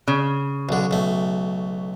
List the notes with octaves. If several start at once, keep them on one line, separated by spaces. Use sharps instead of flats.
C#3
B1 D3
B1 A3